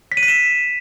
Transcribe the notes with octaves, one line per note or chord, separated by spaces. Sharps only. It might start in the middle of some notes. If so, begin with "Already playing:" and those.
B6
D#7
B6
E7